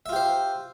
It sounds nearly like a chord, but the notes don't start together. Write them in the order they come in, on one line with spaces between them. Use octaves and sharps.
E5 F4 G4 C5